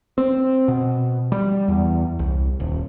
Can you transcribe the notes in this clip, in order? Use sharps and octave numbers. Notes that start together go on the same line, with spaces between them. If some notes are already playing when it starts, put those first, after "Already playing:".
C4
B2
G3
E2
C2
D#1